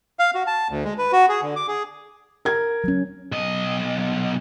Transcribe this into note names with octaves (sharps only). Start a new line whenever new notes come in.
F5
F#4
A5
D2
G#3
B4
F#4
G#4
D3
D6
G#4
A#4 G#6
F#3 C#4
B1 D#5